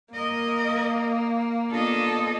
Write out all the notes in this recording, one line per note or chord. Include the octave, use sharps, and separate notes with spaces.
A#3 A#4 D#5
B3 D4 F4 A4 D#5